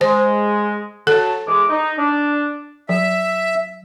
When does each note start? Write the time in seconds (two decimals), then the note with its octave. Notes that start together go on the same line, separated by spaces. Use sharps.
0.01 G#3 C5
1.07 F#3 A4 A5
1.47 E2 G#3 D6
1.69 D#4
1.98 D4
2.89 F#3 E5